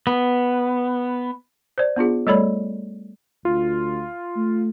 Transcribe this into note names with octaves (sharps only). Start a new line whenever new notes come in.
B3
C5 D5
B3 D4 F4 G#4
G3 A3 A4 C#5 D5 B5
D2 F4
A3